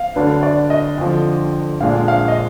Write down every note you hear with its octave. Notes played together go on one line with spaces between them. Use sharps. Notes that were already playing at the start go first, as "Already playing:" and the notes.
Already playing: F5
D2 D3 F#3 D4 B4
D5
D#5
F2 D3 F3
A#1 A#2 G#3 D4 F5
F5
D#5